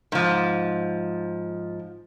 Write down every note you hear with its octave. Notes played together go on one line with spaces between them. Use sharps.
G#2 F3